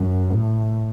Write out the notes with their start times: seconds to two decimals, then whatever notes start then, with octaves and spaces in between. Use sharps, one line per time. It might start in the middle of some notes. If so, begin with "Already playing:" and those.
Already playing: F#2
0.31 A2